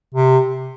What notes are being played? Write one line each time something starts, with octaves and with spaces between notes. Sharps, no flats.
C3